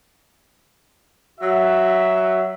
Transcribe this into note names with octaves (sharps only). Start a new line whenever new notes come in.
F#3 F#4 E5